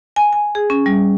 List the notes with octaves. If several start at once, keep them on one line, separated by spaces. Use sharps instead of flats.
G#5
G#5
G#4
C#4
G3